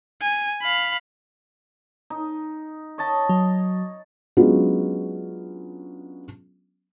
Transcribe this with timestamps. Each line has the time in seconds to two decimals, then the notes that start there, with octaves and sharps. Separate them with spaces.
0.22 G#5
0.62 F5 B5
2.10 D#4
2.98 C#5 D#5 A5
3.29 F#3
4.37 F#3 G#3 B3 C#4 D4 F4